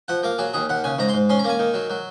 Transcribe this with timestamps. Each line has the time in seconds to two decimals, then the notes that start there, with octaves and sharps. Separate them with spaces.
0.08 F3 F#5
0.23 A#3 F5
0.38 F#3 G#4
0.53 D#2 G#4
0.69 D#2 F#5
0.84 C#3 G#5
0.98 G#2 A#5
1.09 C6
1.14 G#2
1.30 C#4 C6
1.39 A#5
1.44 A#3 G#5
1.59 D#3
1.74 F#3
1.90 F#3